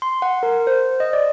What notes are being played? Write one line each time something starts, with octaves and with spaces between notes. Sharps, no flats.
C6
F#5
A#4
C5
D#5
D5